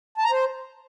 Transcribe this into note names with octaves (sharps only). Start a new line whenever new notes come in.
A5
A#5
C5